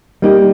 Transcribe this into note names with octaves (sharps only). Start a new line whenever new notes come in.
G3 A#3 D#4 G4